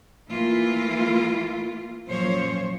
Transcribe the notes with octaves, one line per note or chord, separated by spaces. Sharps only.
E3 A3 A#3 E4 F4
F#2 A#2 F3 C5 C#5